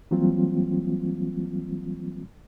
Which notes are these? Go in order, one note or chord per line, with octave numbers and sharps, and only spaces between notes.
E3 F#3 G3 A#3 C4 F4